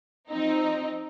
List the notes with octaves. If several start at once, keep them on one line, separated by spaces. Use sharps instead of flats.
F3 C4 D#4